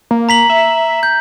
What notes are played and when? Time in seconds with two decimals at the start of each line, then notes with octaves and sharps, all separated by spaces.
0.11 A#3
0.29 A#5 B6 F#7
0.50 E5
1.03 G6